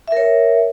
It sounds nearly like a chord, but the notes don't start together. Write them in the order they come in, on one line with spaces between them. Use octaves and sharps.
E5 A#4 C#5